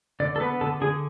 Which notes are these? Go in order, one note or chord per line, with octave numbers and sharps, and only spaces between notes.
D3 D5
A4
B3 B4
D3 A4
D3 G#4